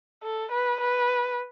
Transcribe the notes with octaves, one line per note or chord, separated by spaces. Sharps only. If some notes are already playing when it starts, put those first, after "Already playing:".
A4
B4
B4